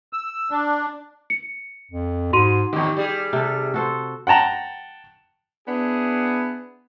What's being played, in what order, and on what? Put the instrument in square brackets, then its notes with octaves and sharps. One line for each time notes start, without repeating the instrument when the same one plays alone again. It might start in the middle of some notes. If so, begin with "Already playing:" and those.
[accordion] E6
D4
[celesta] C#7
[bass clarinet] F2
[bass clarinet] G#2 [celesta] F#4 C6 D#7
[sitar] E2 D#3 [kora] G4
[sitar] G3 G#4
[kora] C3 A4
F#4 A4 C5
[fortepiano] F#5 G5 A5 A#5
[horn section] B3 D4 E4 G#4